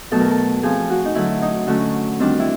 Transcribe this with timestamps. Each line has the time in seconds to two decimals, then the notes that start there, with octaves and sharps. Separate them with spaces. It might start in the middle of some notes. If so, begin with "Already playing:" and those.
0.12 B2 F#3 A3 A4
0.20 A#4
0.31 A4
0.63 F3 A3 C4 G#4
0.90 F#4
1.05 D#4
1.15 D3 F#3 A3 E4
1.42 D#4
1.67 D3 F#3 A3 C#4 F#4
2.20 D#3 G3 C4 D4
2.40 E4